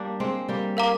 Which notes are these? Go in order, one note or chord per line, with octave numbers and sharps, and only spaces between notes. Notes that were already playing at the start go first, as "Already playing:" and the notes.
Already playing: G3 A#3 D4
G#3 C4
G3 A#3
A#4 F5 A#5 D6